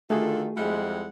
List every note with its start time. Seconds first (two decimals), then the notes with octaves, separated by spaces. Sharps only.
0.10 D3 D#3 A3 F4 F#4 G#4 A4
0.57 F2 G3 G#3 E4 F#5